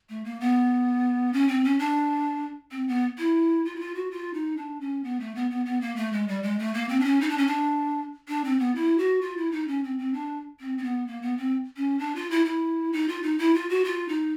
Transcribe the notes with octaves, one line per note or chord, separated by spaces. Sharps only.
A3
A#3
B3
C#4
C4
C#4
D4
C4
B3
E4
F4
E4
F4
F#4
F4
D#4
D4
C#4
B3
A3
B3
B3
B3
A#3
A3
G#3
G3
G#3
A3
A#3
C4
D4
C#4
D#4
D4
C#4
D4
D4
C4
B3
E4
F#4
F4
E4
D#4
C#4
C4
C4
D4
C4
C4
B3
A#3
B3
C4
C#4
D4
F4
E4
E4
D#4
F4
D#4
E4
F4
F#4
F4
D#4